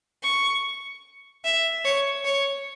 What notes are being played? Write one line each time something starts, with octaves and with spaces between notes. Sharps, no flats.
C#6
E5
C#5
C#5